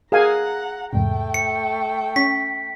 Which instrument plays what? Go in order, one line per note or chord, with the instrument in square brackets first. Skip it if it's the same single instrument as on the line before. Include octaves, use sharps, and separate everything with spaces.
[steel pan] G#4 F5 G#5 [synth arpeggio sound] A#4 [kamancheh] F#5 A#5
[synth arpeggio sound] E2 G#2 C3 [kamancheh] A3 G5
[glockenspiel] C#7
[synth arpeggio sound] C#4 C#6 [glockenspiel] B6